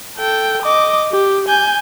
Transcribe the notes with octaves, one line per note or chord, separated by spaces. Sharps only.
A4 G5
D#5 D6
G4
G#5 G6